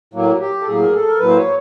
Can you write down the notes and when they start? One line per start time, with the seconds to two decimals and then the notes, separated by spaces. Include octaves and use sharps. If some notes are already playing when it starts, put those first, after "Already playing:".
0.14 A2 F#3 A#3
0.40 G4
0.61 A4
0.67 A2 F#3 A#3 G#4
0.82 A#4
0.93 A4
1.08 A#4
1.19 A2 F#3 A#3 B4
1.29 C5
1.37 C#5